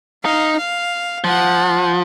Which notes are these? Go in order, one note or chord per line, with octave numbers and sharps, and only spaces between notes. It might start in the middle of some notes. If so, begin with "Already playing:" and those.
D#4 F5
F5
F3 F#5